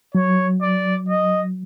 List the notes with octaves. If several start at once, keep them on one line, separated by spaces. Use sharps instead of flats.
F#3 C#5
D5
D#5